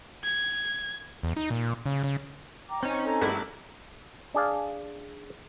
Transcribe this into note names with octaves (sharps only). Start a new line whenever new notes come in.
G#6
E2
D#4
A#2
C#3
C#3
G5 A#5 D6
C4 C#4 D#4 C#5
A4 A#5
A#1 G2 A3 E4 D6
D4 G#4 D5 F5